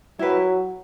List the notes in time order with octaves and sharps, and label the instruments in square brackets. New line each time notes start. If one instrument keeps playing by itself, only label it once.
[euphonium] F#3 [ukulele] E4 G4 B4